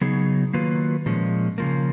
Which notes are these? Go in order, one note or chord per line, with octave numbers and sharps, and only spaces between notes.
C#3 F#3 B3 D#4 G#4
D#3 F#3 A#3 F4 B4
A#2 F3 G#3 C#4
C#3 F3 A#3